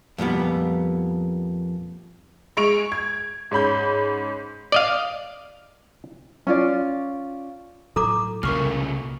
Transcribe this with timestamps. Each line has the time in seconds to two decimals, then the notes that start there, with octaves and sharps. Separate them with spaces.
0.18 F2 A#2 G3 B3
2.57 G#3 C#6 D7 F7
2.92 G#6
3.51 G#2 C#4 B5 G6
4.72 D5 D#5 F5
6.47 C#4 F4 D5
7.96 A2 F#3 A4 A#5 D6
8.43 C2 A#2 C#3 A3 A#4 C#6 F6